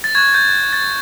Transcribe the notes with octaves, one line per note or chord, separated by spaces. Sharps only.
A6
C#6 F#6 G#6
G6
A6